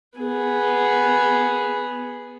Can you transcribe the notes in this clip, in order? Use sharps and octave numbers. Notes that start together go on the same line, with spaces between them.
B3 G#4